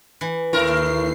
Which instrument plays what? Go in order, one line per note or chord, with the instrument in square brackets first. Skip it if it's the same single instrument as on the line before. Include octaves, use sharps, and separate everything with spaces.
[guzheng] E3
[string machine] D#2 C7 [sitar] A2 E4 A#4